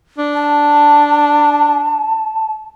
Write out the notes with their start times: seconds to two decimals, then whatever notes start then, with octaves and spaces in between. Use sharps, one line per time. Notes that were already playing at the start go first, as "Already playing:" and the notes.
0.18 D4
0.34 A5